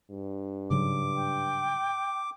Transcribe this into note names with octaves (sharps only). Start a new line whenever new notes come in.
G2
G#2 C#3 F#3 D6
G5